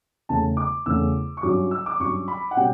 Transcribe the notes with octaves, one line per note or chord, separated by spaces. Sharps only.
E2 C#3 E3 A3 C#4 A5
D6
E2 C#3 E3 A3 C#4 E6
C#6
G2 F#3 C#4 D6
E6
D6
G2 F#3 C#4 C#6
B5
F#5
B2 G3 C#4 G5